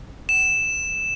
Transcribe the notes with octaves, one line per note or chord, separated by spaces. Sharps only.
E7